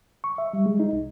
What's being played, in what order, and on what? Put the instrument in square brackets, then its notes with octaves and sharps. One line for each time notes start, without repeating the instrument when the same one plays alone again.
[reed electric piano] C#6
E5
G3
G#3
D#4
C2